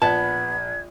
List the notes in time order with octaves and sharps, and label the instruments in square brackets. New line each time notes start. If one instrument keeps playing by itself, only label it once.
[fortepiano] A#1 [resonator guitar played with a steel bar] B3 [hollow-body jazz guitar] A5 [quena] G#6